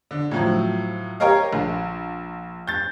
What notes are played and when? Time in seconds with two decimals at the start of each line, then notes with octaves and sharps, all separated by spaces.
0.11 D3
0.31 A2 F3 F#3
1.20 G4 A#4 C#5 D#5 F5
1.53 A#1
2.67 G6 A6